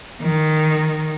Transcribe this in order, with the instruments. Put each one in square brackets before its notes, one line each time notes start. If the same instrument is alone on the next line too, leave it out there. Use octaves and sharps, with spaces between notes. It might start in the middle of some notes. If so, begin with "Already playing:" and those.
[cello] D#3